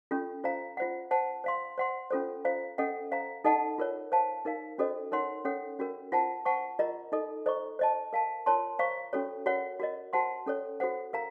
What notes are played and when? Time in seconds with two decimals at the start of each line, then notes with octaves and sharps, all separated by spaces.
0.11 C#4 F4 A4
0.44 F4 C5 F5 A#5
0.77 F4 C5 F#5
1.11 C5 F#5 A5
1.44 C5 F5 C6
1.78 C5 F#5 C6
2.10 C#4 F4 A4 C5
2.45 F4 C5 F5 A#5
2.78 C#4 A4 D#5 F#5
3.12 C5 F5 A#5
3.44 D#4 A4 D#5 F#5 A5
3.78 F4 A#4 C#5
4.12 C5 F5 A5
4.45 D#4 A#4 F5
4.78 C#4 F#4 A4 C5 D#5
5.11 D#4 A#4 C#5 F#5 C6
5.45 C#4 A4 C#5 F#5
5.79 C#4 F#4 A#4
6.12 F4 C5 F#5 A5
6.45 C5 F#5 A5 C#6
6.79 F4 A#4 D#5 A#5
7.12 D#4 A4 D#5
7.46 A4 C5 D#5 A#5 C#6
7.79 C5 D#5 A5
8.13 A#4 F5 A5
8.46 F4 A#4 C#5 A5 C6
8.79 C5 F5 A#5 C#6
9.13 C#4 F#4 A4 C#5
9.46 F#4 A#4 C#5 F#5
9.80 F#4 A#4 D#5
10.13 F#4 C5 F#5 A5 C6
10.46 C#4 A4 C#5
10.80 F#4 A4 C5 F#5
11.13 A#4 F5 A#5